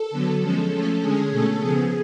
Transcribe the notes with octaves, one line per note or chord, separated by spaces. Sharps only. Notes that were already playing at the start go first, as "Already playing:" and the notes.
Already playing: A4
D3 F#3 B3
F3 G#3 C#4 A4
F3 A3 C#4
D3 G#3 C#4 G#4
B2 A3 C#4 A4
C#3 F3 B3 G#4